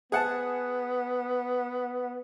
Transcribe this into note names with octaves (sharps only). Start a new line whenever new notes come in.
B3 G#4 F#5 A5